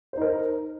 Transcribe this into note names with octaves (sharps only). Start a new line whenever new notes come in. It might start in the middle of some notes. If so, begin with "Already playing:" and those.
D#4 A#4 C5